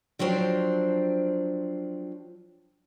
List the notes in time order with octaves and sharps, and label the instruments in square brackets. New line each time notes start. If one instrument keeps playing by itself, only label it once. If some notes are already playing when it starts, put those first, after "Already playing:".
[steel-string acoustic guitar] F3 F#3 C4 D4 C5